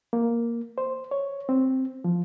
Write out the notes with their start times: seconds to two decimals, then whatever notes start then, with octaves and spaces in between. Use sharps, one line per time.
0.13 A#3
0.78 C5
1.11 C#5
1.49 C4
2.04 F3